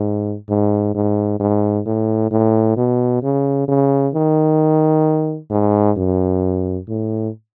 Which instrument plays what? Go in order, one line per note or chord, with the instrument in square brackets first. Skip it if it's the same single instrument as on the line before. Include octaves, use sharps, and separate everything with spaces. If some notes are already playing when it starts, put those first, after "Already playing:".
Already playing: [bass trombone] G#2
G#2
G#2
G#2
A2
A2
B2
C#3
C#3
D#3
G#2
F#2
A2